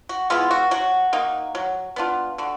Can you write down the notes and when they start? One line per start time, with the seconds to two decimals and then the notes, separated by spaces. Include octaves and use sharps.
0.09 F#4
0.30 G#3 B3 E4 F4
0.51 F#4
0.71 F#3 F#4
1.13 A#3 D#4
1.55 F#3
1.96 B3 D4 F4
2.38 D3 F#4